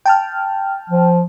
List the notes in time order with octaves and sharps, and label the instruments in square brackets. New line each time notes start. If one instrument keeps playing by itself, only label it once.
[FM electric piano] G5 A5 F6
[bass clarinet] F3